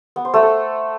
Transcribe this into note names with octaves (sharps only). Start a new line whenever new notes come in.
B3
C5
A3
A4